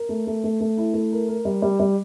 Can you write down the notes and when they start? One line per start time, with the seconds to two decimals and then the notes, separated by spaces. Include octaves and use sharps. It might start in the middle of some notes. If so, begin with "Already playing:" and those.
Already playing: A#4
0.09 A3
0.27 A3
0.44 A3
0.61 A3
0.77 E4
0.94 A3
1.12 A#4
1.28 A#4
1.45 G3
1.62 G3
1.80 G3